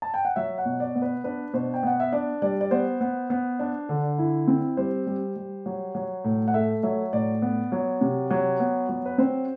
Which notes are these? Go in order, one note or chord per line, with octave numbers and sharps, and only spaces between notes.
A5
G5
F#5
F#3 E5
F#5
B2
D5
B3
B4
D4 B4
B2 C5
G5
B3 F#5
E5
D4 D5
G3 D5
D5
B3 C5
B3
B3
D4
D3
E4
C4
G3 C5
G3
G3
F#3
F#3
A2
F#5
A3 E5
F#3 E5
A2 D5
B3
F#3
C3
F#3
B3
F#3
B4
C4 C5